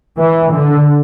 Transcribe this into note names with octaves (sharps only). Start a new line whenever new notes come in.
E3
D3